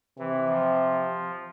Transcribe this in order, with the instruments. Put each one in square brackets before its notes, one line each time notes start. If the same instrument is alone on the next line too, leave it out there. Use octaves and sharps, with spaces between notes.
[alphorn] C3 [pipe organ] E3
[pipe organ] F3